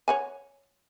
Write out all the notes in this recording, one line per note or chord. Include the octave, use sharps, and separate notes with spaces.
C#5 F#5 G#5